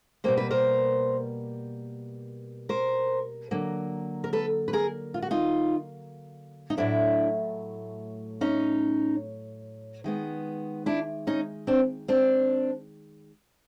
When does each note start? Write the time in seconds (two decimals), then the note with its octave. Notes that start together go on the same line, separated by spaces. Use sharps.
0.24 B2 G3 A#3 C5
0.37 B4
0.51 A#4 C5
2.69 A#4 C5
3.51 D3 F#3 A#3
4.24 A#4
4.33 A4 B4
4.68 B4
4.73 G#4 A#4
5.14 F4
5.22 F#4
5.31 D#4 F4
6.70 D#4
6.77 A2 F#3 A3 D4 E4
8.41 C#4 D#4
10.04 D#3 G#3 B3
10.86 D4 E4
11.27 C#4 D#4
11.67 C4 D4
12.08 C4 D4